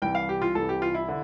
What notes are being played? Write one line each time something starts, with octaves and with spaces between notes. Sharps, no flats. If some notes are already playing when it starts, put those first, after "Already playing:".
C2 C3 E3 G5
F5
G4
F4
C2 C3 E3 A4
G4
F4
E4
D3